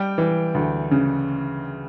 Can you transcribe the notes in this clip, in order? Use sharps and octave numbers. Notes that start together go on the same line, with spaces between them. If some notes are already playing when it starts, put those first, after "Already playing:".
Already playing: G3 G5
E3
D2
C#3